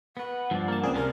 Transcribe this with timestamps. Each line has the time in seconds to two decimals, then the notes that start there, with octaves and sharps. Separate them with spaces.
0.17 B3 B4 F#5
0.51 G2 F3 D5
0.68 A#3 A5
0.83 C#2 A#3 C4 G#4 D5
0.96 C3 A#4 A5